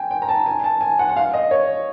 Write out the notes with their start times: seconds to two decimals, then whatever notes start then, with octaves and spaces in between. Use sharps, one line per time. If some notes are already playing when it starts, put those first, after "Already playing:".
Already playing: G5 G#5
0.11 G5
0.22 A#5
0.29 A5
0.46 G#5
0.64 A5
0.81 G#5
0.99 F#5
1.09 F#5
1.16 F5
1.34 D#5
1.51 C#5